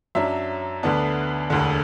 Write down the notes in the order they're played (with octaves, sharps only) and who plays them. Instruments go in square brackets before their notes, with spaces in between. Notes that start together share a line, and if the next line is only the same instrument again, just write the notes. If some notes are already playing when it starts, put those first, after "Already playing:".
[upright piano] F#2 F#3 D4 E5
D2 D3 B3 D4
E1 D2 D3